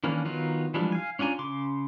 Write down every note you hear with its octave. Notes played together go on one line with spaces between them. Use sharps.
D#3 E3 A#3 C#4 D4
D#3 F#3 B3 D#4 F4
E3 F3 G3 G#3 D4
F5 G#5
C#4 D4 F4 G#5 A#5
C#3 C6 D6